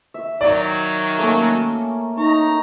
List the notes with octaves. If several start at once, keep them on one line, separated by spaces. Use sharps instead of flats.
E5
D#3 F#3 D5
A3 A#3 C#4
D#4 A#5 C#6